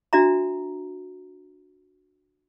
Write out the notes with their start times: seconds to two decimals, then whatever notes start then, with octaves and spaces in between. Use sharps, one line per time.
0.13 D4 F#4 E5 A#5